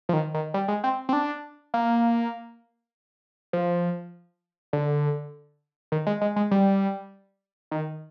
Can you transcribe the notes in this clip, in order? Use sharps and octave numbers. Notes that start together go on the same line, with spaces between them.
F3
D#3
D#3
G3
G#3
C4
C4
D4
A#3
F3
D3
D#3
G#3
G#3
G#3
G3
D#3